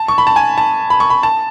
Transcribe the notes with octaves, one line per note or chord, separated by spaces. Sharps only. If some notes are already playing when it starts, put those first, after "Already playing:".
Already playing: A5
C#6
B5
A5
G#5
A5
B5
C#6
B5
A5